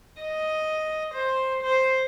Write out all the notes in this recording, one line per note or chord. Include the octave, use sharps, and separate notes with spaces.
D#5
C5
C5